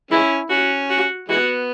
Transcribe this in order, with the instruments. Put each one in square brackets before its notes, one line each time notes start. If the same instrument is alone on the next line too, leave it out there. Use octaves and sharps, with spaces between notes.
[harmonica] E3 G#3 C#4 [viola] E4
[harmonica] C#4 [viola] F#4
[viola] F#4
[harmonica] E3 G#3 B3 [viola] F#4